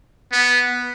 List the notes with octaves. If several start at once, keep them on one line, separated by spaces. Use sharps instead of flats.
B3